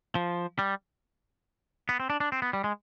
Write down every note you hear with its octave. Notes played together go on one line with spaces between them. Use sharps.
F3
G3
B3
C4
D4
D4
C4
B3
G3
G#3